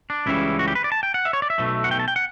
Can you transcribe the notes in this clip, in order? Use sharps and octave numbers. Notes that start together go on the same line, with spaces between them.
D4
C#2 C#3 E3 G3 E4
F#4
G4
B4
D5
A5
G5
F#5
E5
C#5
D5
E5
B1 B2 A3
F#5
G5
A5
G5
F#5